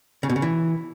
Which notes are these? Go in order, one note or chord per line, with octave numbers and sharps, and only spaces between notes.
C#3
B2
C#3
E3